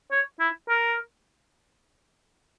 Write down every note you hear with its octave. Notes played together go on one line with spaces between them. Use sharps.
C#5
E4
A#4